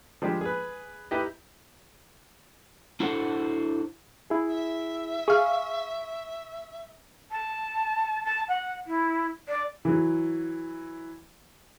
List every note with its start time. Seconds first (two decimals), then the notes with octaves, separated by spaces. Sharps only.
0.22 F3 G3 G#3 D4 G4
0.41 G#4 B4
1.11 D#4 E4 G4 B4 D#5
3.00 D4 E4 F#4 A4 C5 F#5
4.30 E4 G#4
4.48 E5
5.28 G#4 F5 C#6
7.31 A5
8.24 A5
8.48 F#5
8.87 E4
9.48 D5
9.85 E3 F#3